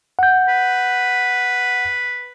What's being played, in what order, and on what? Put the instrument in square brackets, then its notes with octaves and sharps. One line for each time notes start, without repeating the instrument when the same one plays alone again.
[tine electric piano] F#5 G6
[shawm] B4